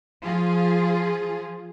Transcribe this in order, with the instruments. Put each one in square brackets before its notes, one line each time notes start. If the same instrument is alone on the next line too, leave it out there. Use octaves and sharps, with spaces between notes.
[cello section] F3 F4 G#4